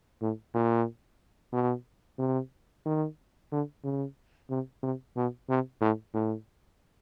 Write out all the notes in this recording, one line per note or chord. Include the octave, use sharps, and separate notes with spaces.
A2
A#2
B2
C3
D#3
D3
C#3
C3
C3
B2
C3
A2
A2